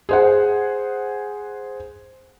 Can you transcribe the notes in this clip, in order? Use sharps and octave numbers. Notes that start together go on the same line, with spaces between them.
G#4 C5 F#5